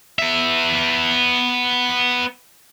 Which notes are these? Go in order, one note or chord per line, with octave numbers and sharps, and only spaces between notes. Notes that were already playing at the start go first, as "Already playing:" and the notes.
B3 E5